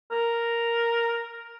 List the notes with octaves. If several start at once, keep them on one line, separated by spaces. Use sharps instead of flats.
A#4